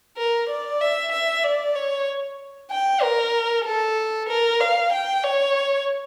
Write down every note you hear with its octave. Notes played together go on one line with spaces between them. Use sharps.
A#4
D5
E5
E5
D5
C#5
G5
A#4
A4
A#4
F5
G5
C#5